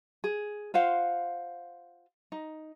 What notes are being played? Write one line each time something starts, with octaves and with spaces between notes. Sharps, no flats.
G#4
F4 C5 F5 F#5
D#4